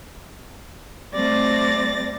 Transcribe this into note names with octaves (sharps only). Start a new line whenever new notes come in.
G3 A3 C4 D5 A6 A#6